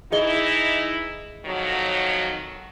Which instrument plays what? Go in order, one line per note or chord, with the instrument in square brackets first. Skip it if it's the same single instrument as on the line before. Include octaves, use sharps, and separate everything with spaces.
[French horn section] E3 D#4 E4 [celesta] G#4 D#5 G7
[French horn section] F2 D#3 F#3